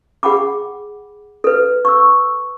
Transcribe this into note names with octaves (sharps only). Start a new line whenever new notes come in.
G#4 F#5 G5 B5 D6
A4 B4
C#6 E6